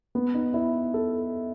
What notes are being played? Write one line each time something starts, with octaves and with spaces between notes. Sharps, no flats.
B3
D#4
E4
A4